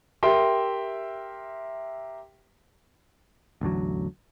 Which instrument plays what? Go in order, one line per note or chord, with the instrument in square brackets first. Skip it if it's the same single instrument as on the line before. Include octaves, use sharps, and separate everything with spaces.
[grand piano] G4 A#4 E5 G5 C6
[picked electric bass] A1 E2 D3 F#3